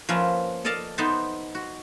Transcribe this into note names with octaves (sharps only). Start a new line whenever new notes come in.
F3 A#3 C#4 B4 E5 A#5
A4 D5 D#5 F5 A5
B3 D#4 A4 C5 E5 A5
F#4